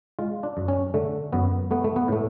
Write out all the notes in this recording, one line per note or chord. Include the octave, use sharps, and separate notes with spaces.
G#3 F4
D4
F#2
C#4
D3 A3
F#2 B3
A3 B3
A3
B3
A2 A3